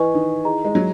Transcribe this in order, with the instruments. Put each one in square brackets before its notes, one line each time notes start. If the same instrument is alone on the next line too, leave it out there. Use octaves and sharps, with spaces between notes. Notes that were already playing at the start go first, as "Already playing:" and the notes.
Already playing: [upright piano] E3 [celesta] B4 D#5 G#5 C#6
[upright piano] D#3
[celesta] E4 G#4 D#5 A#5
[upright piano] G#3
F#3